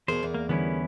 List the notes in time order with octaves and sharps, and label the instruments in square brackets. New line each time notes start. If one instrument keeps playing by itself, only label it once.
[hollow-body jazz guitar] E2 B2 [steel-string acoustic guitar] G#4 A#4 D5 [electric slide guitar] C5
[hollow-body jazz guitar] E2
[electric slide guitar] A#3
[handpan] D3 E3 G3 [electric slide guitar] B3 C#4 E4